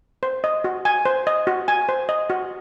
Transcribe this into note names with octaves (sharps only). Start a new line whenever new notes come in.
C5
D#5
F#4
G#5
C5
D#5
F#4
G#5
C5
D#5
F#4